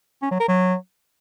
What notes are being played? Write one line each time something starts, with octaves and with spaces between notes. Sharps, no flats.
C#4
F#3
A#4
F#3